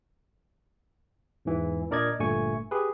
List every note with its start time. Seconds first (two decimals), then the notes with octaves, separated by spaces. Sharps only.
1.45 E2 G#2 E3
1.90 A#2 D4 A#4 D5 D#5 G#6
2.19 G1 G2 A#2 A3 G#5 C#6
2.71 G4 G#4 B4